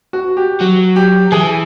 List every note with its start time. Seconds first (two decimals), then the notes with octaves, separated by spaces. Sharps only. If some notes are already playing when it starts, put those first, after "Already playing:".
0.13 F#4
0.37 G4
0.60 F#3 F#4
0.96 G4
1.32 E3 G#4